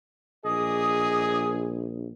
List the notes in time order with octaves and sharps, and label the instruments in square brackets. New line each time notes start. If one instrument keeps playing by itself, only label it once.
[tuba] A#1 [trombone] G#4 [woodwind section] D#5 D6 D#6